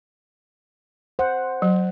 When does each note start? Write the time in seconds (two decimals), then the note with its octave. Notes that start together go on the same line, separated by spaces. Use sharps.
1.19 C5 F#5
1.62 F#3